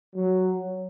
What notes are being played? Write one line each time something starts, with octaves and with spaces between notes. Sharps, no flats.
F#3